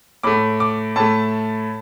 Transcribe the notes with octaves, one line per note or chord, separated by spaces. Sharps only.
A2 A3 D6
D6
A2 A3 A5